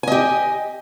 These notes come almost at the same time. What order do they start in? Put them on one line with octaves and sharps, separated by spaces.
G#5 D#5 G4